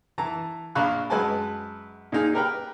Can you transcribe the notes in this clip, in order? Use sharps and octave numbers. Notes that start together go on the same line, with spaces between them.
E3 A5 A#5
A#1 A#3 F5 B5 C#6 F#6
F#2 G#3 B4 D#5 G#5 A5
A#2 A#3 D#4 G#4
G4 A#4 B4 G5